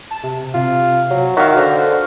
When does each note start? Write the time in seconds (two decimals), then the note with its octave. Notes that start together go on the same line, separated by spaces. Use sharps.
0.11 A5
0.23 C3
0.55 C3 F4
1.10 F#3
1.37 D#3 F#4 E5 F5
1.57 D3 C5